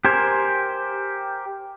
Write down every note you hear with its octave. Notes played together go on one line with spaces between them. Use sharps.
G4 A#4 C5 G#5